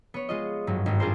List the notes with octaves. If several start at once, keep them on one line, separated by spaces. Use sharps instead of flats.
B3 C#5
G#3 F4 D#5
G#1 G2 F#3
G#1 G2
D4 F4 G#4 A#4 C5